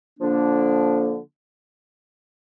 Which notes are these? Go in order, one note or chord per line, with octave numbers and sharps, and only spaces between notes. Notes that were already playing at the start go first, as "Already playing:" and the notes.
D3 F3 A#3 D4